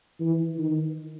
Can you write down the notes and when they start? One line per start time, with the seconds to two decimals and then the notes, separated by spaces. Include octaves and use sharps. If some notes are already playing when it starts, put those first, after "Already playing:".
0.21 E3
0.59 D#3